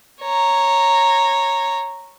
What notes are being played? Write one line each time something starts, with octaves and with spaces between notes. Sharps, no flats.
C#5 A#5